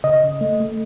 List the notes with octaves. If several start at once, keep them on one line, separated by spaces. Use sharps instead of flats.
C#3 D#5
C#3
A3
A3